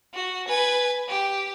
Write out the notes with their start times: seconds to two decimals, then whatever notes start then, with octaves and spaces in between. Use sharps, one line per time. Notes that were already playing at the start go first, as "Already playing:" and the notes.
0.14 F#4
0.48 B4 G#5
1.09 G4